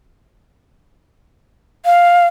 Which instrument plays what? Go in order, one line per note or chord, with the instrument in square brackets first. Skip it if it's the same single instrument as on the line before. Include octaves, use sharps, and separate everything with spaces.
[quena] F5